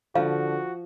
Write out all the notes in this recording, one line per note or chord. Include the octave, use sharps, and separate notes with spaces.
D3 F3 F#4 F5